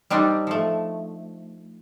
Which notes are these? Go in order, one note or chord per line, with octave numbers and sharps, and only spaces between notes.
G3 C4 D4 D#4
F3 A3